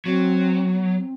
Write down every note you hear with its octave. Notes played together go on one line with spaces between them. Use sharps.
F#3 C4
B3
C4